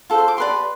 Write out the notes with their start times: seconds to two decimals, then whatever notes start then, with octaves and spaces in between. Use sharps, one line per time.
0.10 F4 A4 C5
0.18 C6
0.28 D6
0.37 G4 B4 D5 C6